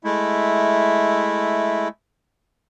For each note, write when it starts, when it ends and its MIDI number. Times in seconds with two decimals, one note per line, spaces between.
0.05 1.88 56
0.05 1.88 57
0.05 1.88 64